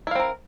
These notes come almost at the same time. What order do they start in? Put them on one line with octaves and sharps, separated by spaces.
E4 F5 C4 A#4